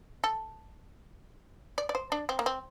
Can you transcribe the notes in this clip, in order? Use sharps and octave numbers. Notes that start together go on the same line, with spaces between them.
A4
D5
D5
C5
D4
C4
A#3
C4